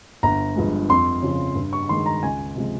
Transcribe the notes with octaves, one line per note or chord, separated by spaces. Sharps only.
G1 A#5
G2 F3 G#3
F2 C6
C#3 F3
G2
C#6
D#3 G#3 C6
A#5
C#2 G#5
C3 F3 G#3